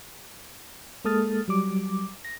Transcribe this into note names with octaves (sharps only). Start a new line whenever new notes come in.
G#3 A#3 A4 D#6 F6 A6
F#3 G3 D6
A#6